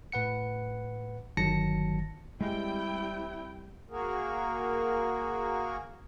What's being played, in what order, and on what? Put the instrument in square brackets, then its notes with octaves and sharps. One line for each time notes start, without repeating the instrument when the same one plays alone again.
[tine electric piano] A2 B4 F#5 C#7
G1 D#3 F#3 A5 A#6 C#7
[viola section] G3 C4 G5 [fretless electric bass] G#3 [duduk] E4
[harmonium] A#3 F#4 G#4 A#4